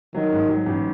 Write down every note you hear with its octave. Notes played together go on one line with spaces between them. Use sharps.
D#3 F#3
G#2
F#3
A1